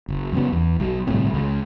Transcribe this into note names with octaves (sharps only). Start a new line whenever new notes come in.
F#1
F#2 C#3 B3
E2
B1
G1 C2 A2 C4
C#2